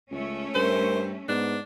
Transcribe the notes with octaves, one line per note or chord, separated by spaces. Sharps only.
C#2 A3 C#4
G2 A#4 C5
G#2 B3 D4